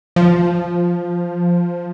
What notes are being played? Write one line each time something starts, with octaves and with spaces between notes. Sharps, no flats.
F3